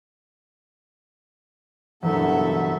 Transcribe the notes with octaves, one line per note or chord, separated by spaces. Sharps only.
F#1 E2 G2 B2 B3 A4 E5 F#5